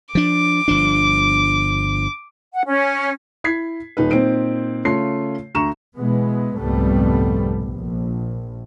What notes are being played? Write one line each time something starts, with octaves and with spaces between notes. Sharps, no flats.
F3 D4 D6
G1 F3 D4
F#5
C#4
E4 G#6 B6 C7
D#1 D#4 B4
A#2 C4 D#4 C5 D7
C#3 A3 F4 C#5 C6 C7
D2 A#5 C#6 E7
B2 E3 G#3 B3
C2 F2 G#2 G3 A3 B3
A#1